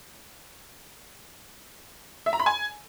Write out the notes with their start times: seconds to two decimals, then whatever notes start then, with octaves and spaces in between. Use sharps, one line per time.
2.26 E5
2.33 A#5
2.40 B5
2.46 G#5